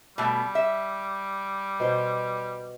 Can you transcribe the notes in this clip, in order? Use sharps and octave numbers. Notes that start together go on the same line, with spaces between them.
B2 G3 A3
E5
B2 C5